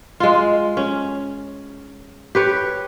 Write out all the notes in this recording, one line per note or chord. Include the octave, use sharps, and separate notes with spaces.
G#3 F4
C#4
G4 B4 C#5